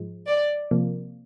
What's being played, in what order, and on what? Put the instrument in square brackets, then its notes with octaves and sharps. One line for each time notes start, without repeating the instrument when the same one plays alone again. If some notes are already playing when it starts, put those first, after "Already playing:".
Already playing: [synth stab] G#2 F3 G#3
[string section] D5
[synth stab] C3 F3 A#3